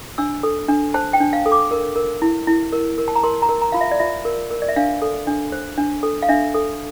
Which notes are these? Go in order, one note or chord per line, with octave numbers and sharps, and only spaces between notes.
D4 E6
A4
D4
C5 A5
G5
D4
F5
A4
D6
A#4
A#4
E4
E4
A#4
A#4
A5
A#5
A#4 C6
A#5
A#4
A#5
F4 F5
E5
D5
F4 E5
A#4
A#4
D5
E5
D4 F5
A4
D4
C5
D4
A4
F5
D4 E5
A4